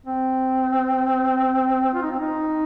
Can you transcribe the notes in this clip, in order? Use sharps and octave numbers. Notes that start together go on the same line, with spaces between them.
C4
F4
D#4
C4
D#4